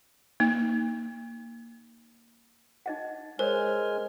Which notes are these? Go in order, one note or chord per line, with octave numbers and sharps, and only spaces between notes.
A#3 D#4
D#4 D#5 F#5
G#3 A#4 C5 C#5 G#5 F6